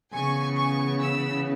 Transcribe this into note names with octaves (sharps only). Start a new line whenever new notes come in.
C#3 E3 B3 G#5 C#6
G#5 C#6
B5 E6